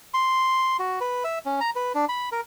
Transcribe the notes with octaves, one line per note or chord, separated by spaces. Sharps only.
C6
F#4
B4
E5
C#4
A#5
B4
D4
B5
A#4